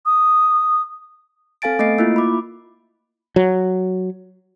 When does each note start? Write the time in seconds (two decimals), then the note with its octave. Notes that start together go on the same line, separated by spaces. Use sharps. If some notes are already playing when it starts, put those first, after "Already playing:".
0.06 D#6
1.62 C4 A4 F5 G#5 A6 D7
1.79 A3 B3 D#5 A6 C7 D7
1.98 A#3 E4 F4
2.16 B5 D6
3.36 F#3